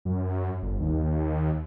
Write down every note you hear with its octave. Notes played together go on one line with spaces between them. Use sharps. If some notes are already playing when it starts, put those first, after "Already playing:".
F#2
G1
D#2